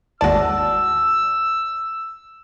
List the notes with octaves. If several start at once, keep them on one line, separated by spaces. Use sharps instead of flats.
G#1 D#2 F#4 D5 A5 E6